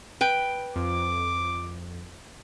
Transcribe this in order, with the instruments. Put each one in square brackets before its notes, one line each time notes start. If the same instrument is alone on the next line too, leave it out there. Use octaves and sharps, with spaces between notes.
[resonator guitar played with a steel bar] B4 G5
[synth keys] F2 [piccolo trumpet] D6